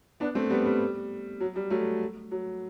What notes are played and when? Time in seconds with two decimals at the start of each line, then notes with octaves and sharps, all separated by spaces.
0.20 B3 D4
0.35 A3 C4
0.50 G3 B3
0.65 G3
1.40 F#3
1.56 G3
1.70 F#3 A3
2.31 F#3